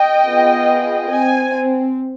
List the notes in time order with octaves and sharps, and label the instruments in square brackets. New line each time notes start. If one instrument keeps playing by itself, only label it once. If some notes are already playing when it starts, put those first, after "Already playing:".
Already playing: [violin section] D#5 G5
B3 F4 G#4
C4 G#5